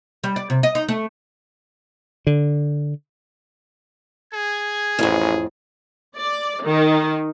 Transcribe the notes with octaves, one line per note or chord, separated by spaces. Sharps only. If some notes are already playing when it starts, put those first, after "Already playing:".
G3
D5
C3
D#5
D#4
A3
D3
G#4 G#6
A1 F2 A2
D5
D#3